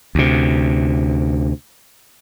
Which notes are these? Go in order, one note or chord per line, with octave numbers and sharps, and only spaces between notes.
D2 C3